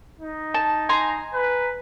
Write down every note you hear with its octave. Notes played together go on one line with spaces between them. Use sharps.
D#4
A5
G#5 A#5 C6
B4